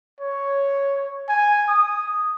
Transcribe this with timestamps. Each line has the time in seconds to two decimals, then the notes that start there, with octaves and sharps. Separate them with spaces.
0.20 C#5
1.29 G#5
1.68 D#6